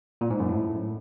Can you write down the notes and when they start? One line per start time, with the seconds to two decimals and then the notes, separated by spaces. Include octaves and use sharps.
0.21 A#2
0.30 G#2
0.39 F#2
0.49 A2